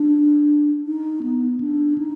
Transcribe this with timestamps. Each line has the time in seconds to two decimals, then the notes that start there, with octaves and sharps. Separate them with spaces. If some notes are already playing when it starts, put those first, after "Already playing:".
Already playing: D4
0.86 D#4
1.23 B3
1.60 D4
1.98 D#4